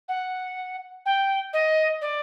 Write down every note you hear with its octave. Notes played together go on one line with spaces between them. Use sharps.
F#5
G5
D#5
D5